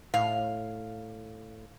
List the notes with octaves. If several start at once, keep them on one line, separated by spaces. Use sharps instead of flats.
A2 F5